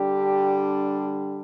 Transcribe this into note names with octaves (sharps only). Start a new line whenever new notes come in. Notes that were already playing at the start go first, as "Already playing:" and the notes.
Already playing: D3 G3 D4 G4
G4